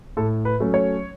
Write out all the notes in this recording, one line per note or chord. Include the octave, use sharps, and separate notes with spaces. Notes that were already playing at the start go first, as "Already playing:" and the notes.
A2 A4
B4
F#3 A3 C#4
C#5